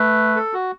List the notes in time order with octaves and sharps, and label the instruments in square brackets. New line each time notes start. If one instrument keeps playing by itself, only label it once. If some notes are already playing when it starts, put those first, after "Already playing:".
Already playing: [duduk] A3 [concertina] B4
[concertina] A4
F#4